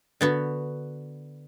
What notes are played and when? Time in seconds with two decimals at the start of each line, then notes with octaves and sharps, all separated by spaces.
0.21 D3 B3 F#4